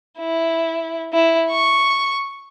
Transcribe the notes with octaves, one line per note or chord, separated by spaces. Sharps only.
E4
E4
C#6